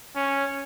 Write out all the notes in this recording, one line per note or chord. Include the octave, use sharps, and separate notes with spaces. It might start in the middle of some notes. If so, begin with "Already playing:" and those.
C#4